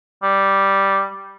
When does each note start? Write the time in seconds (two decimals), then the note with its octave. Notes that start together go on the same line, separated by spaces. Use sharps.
0.23 G3